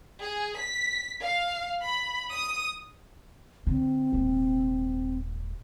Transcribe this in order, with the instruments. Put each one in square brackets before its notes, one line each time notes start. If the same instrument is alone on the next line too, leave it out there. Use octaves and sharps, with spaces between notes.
[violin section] G#4
B6
F5
B5
D#6
[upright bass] D3 [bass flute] C4
[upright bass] D#1 G#2